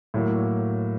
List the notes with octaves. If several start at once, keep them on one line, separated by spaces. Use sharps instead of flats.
A2 F#3 A#3